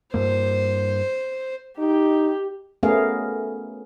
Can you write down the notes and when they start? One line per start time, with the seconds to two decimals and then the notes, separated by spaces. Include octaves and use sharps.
0.14 G2 A#3 C5
1.78 D#4 G4
2.83 A3 B3 C#4 G#4 A#4 F5